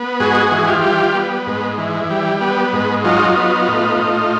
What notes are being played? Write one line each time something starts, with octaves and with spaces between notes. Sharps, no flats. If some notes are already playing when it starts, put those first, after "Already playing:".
Already playing: B3
G#2 F#4 G#4
E3
F4 G4
G3
B3
G#2
E3
G3
B3
G#2
F#3 D#4 F4
B3
A2
A2